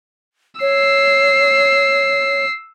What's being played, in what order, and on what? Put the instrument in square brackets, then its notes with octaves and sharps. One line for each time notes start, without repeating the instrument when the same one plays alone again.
[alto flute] C#5 [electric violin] E6 C7